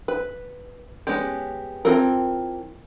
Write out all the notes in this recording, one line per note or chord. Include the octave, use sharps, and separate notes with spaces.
B4
G#3 B3 C#4 G4
E3 C4 F4 A4 A#4